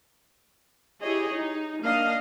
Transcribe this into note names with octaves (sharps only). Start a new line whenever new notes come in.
E4 G4 G#4 C#5 D#5
D#4
A#3 D4 D#5 F5